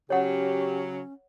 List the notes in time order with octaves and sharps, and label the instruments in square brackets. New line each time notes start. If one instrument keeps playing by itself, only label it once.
[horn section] C#3 F#3 [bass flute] C#4 [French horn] G4 [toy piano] C#5 F#5